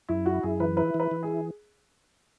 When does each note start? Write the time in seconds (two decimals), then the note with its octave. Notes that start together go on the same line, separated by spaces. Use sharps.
0.09 F#2 E4
0.26 E4 F#4
0.43 F#2 G#4
0.60 E3 B4
0.77 E4 B4
0.94 E3
1.00 B4
1.11 E3
1.23 E4 G#4